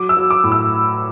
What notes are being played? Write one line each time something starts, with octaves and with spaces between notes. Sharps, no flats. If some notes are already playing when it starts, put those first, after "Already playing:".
Already playing: F#3 D6
E6
F#3
D6
A2
E6